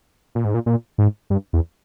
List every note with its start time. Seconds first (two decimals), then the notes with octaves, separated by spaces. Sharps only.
0.35 A#2
0.45 G#2
0.54 A#2
0.66 A#2
0.98 G#2
1.30 G2
1.53 E2